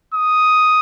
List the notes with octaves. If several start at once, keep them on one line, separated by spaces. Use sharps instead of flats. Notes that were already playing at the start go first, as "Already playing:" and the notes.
D#6